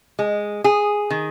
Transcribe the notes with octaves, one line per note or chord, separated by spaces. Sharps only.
G#3
G#4
D#3